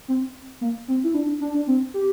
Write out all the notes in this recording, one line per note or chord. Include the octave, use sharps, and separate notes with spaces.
C4
A#3
C4
E4
D4
D4
D4
C4
G4